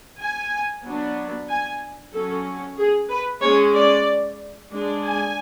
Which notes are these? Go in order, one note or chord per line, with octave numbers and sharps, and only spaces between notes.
G#5
F#3 B3 D4
G#5
F#3 C#4 A4
G#4
B4
G#3 C#4 C#5
D5
G#3 D4
G#5